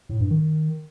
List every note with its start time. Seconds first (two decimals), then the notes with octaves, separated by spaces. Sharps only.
0.09 A2
0.20 G2
0.30 D#3